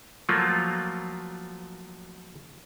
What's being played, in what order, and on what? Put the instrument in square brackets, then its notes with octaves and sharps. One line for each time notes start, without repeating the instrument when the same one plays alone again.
[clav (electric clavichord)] F3 F#3 A3 A#3 F4